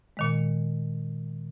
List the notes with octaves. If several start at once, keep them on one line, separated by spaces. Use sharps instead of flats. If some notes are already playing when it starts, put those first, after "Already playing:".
A#2 D#3 G#3